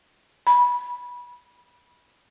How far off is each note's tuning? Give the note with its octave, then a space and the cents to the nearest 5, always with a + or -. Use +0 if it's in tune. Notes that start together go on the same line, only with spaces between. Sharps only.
B5 -20